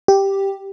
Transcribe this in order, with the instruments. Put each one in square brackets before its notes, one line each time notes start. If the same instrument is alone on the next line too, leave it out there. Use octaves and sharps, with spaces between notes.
[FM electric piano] G4